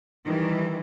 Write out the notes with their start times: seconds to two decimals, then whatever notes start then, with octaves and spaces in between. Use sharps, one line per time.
0.25 D#3 E3 G3